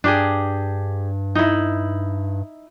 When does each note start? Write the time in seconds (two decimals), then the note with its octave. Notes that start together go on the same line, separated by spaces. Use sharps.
0.04 G2 D4 G4 G#4
1.35 D#4 E4